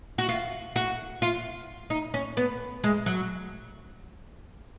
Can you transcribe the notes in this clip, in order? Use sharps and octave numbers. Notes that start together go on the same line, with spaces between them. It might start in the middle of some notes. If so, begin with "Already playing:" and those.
F#4
F4
F#4
F4
D#4
C#4
B3
G#3
F#3